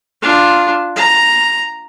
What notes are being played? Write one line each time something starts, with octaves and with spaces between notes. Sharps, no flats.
D4 F4
A#5